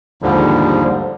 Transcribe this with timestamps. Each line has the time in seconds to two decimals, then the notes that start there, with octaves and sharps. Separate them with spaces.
0.22 D#2 G#2 D3 F3 G3